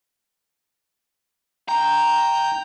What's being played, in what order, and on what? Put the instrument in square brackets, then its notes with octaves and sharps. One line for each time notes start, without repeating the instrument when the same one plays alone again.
[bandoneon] G5 G6 [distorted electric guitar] A#5